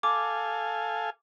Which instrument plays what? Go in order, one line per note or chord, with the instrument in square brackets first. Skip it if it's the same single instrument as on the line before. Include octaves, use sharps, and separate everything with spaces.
[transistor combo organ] A4 F5 G#5 [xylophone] D6